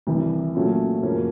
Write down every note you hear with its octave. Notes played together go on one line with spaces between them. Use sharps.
C2 C3 E3
A#2 F#3 A3 C#4 F4
F#2 C#3 F3 A#3 C#4